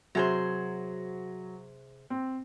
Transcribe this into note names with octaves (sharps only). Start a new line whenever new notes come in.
C3 F#3 G#4 C5
C4